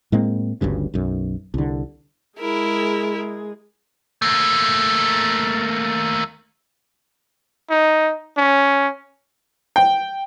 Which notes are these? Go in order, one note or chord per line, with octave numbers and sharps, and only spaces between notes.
A2 G#3 A#3 C4
G1 D2 G2 C#3
B1 F#2
C2 D3
G#3 E4 G#4 A#4
A3 A#3
D#4
C#4
G5